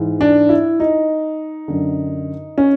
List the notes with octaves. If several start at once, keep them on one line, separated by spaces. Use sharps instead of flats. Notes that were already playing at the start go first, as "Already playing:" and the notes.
Already playing: G#2 E3
D4
E4
D#4
F#2 D3
C#4